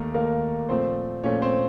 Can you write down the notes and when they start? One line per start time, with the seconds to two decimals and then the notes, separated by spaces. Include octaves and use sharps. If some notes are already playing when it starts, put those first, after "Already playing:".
Already playing: D#2 D#3 A3 A#3 A#4
0.14 D#2 D#3 A3 A#3 A#4
0.69 A#2 F3 A3 C4 C5
1.24 A#2 F3 A3 C#4 C#5
1.42 C4 C5